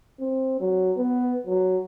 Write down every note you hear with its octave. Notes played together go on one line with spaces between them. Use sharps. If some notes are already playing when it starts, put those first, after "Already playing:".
C4
F#3
B3
F#3